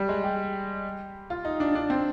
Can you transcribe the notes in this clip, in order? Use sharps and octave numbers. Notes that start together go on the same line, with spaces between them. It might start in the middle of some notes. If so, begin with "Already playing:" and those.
Already playing: G3
G#3
G4
F4
D#4
D4
D4
C4